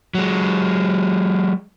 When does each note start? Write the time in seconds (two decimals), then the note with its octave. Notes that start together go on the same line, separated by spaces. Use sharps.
0.14 F#3 G#3